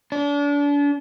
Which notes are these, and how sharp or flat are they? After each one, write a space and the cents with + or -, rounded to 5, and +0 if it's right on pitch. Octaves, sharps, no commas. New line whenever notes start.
D4 -35